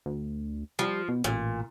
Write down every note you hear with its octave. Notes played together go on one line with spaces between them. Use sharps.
D2
F3 G3
B2
A1 A#2